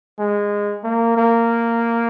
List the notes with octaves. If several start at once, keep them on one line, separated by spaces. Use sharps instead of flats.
G#3
A#3
A#3